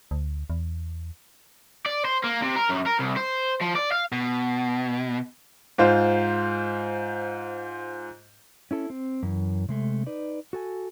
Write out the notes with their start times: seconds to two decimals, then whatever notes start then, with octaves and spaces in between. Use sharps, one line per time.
0.11 D2
0.50 E2
1.86 D5
2.05 C5
2.24 A#3
2.42 C3
2.56 A#4
2.69 F#2
2.86 A#4
2.99 C2
3.17 C5
3.61 F3
3.75 D5
3.92 F5
4.12 B2
5.78 G#2 F4 C5
8.71 C#4 E4 A4
8.90 C4
9.23 F#2 E3
9.69 C3 G#3 A3
10.07 D#4 B4 D5
10.53 F#4 A4 G#5